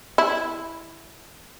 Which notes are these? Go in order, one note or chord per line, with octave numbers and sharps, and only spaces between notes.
E4